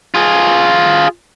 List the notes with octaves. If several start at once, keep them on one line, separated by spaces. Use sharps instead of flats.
F4 G#4